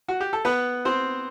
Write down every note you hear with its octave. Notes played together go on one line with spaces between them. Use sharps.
F#4
G4
A4
B3 B4
C4 C5